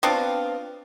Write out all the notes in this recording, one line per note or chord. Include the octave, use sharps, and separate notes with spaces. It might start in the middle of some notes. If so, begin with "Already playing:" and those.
B3 C4 D4 F4